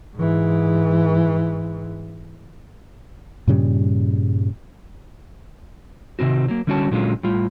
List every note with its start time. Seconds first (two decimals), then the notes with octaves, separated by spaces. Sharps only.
0.17 G#2 E3
3.48 G2 A#2 C#3 G3
6.19 C3 D#3 C4 F#4
6.48 F#3 A#3
6.67 D3 G3 C#4 F#4 C#5 A5
6.91 A#2 D3 F#3 G#3 C#4 F4
7.23 A2 G3 F4